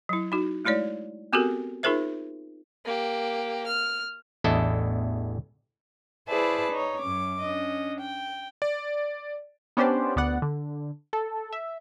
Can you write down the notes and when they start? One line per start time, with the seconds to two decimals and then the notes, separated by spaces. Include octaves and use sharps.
0.09 F#3 E4
0.32 D#4 F#4
0.65 G#3 A3 E4 C#5 D5
1.33 B3 C4 F#4 G4 A4 A#4
1.83 D#4 F4 G#4 A#4 C5 E5
2.85 A#3 G4
3.67 F6
4.44 A1 E2 D4 E4 A4 D#5
6.28 E4 G#4 B4 C5 D5 A5
6.71 D#4 C#5
7.00 F#2 C#4 D6
7.41 C#4 D4 D#5
8.01 G5
8.62 D5
9.77 B3 C#4 D4 G4 C5 D5
10.16 D2 B3 D5 F#5
10.42 D3
11.13 A4
11.53 E5